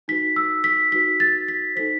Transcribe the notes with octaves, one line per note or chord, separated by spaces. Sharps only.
D#4 F#4 B4 B6
E6
B6
D#4 F#4 B4 B6
A6
B6
D#4 A4 C5 B6